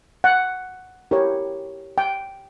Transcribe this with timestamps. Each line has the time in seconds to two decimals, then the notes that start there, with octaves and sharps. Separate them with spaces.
0.24 F#5
1.11 E4 G4 A#4 C#5
1.98 G5